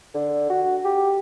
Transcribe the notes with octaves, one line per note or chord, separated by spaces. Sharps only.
D3
F#4
G4